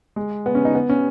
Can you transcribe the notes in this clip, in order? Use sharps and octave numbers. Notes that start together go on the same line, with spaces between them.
G#3
B3
C#4
D#4
B3
C#4